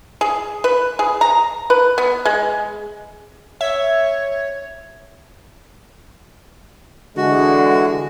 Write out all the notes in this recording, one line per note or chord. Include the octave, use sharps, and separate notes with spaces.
G#4
B4
G#4
A#5
B4
B3
G#3
C#5 E5
D3 E3 G#3 F#4